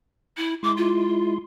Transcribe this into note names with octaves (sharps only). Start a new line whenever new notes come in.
E4
G#3 E4 C6 D6
F4